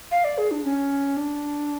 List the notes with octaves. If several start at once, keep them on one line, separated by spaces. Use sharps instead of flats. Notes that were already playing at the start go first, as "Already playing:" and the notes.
F5
D5
G#4
D4
C#4
D4